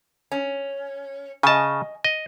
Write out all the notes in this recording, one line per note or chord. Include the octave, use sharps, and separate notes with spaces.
C#4
C#3 D#5 G#5 A5
D#5